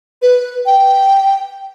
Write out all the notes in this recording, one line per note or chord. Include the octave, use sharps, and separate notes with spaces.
B4
G5